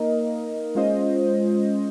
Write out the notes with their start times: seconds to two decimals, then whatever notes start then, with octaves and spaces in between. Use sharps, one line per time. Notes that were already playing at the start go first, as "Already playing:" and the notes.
Already playing: A#3 D#4 A#4 D#5
0.75 G#3 C#4 F4 C5 D#5